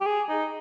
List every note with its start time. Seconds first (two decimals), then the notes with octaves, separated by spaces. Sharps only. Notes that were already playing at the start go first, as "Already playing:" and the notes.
0.01 G4
0.06 G#4
0.29 D#4